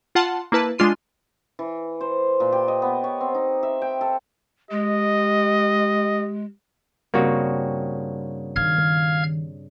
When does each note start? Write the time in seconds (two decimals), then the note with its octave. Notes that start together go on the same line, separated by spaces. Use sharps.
0.15 F4 F#5 A5 C6
0.52 A#3 E4 B4 A5
0.78 G#3 D4 F4 C6 D#7
1.59 E3
2.01 C5
2.40 A#2
2.52 G4
2.68 D#5
2.82 B3
3.04 C#5
3.21 C4
3.34 D#4
3.63 E5
3.82 G5
4.01 A4
4.71 G#3 G4 D#5
7.14 G2 C#3 A#3 C4 F#4
8.56 D#3 F5 F6 G#6